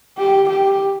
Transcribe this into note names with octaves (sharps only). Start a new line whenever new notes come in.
G4
G4